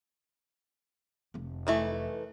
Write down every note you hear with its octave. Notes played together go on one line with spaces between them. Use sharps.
F1 F2
D#3 E3 A3